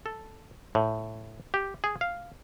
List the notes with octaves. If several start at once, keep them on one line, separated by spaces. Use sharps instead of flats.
A4
A2
G4
G#4
F5